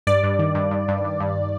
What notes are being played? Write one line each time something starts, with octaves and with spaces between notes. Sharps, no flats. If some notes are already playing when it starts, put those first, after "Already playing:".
G2 D5
G2
D#3
G2
G2
G2
G2
G2